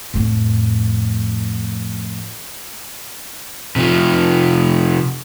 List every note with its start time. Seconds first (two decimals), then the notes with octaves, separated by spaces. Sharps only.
0.14 F2 A2
3.76 C3 F3